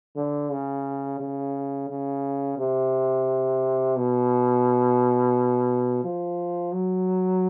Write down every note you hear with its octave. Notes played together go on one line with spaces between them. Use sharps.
D3
C#3
C#3
C#3
C3
B2
F3
F#3